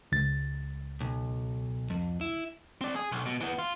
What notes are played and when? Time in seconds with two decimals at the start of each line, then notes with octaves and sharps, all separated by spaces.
0.12 C#2 A6
1.00 B1
1.90 F2
2.21 E4
2.81 C4 D5
2.96 G#4
3.12 B1
3.26 B2
3.41 E3 B3
3.59 F4